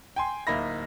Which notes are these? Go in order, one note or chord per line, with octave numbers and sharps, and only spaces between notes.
G5 G#5 C6
D1 A#3 D#4 E5 B5 A#6